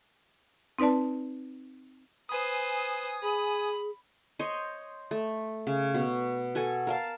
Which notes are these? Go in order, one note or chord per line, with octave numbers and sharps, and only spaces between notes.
C4 D#4 B4 D5 A5
B4 C5 G#5 D#6
G#4 B5
C5 C#5 D#5
A3
C#3
B2
F#4 A4 G#5
A#4 F5 A5